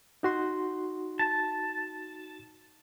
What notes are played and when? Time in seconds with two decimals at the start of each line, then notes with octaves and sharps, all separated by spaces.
0.23 D#4 F#4 C6
1.19 A5